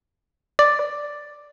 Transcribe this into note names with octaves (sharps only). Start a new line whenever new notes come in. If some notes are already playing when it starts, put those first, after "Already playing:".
D5